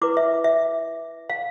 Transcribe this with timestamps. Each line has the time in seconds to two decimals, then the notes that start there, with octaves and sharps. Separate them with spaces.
0.01 E4 B4 D6
0.17 E5
0.44 E5
1.30 F5